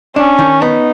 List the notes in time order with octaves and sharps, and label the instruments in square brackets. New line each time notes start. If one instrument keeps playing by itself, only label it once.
[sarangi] C#4 [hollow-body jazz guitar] D4
[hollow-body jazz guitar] D#3
[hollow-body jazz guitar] B3 [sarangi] D#4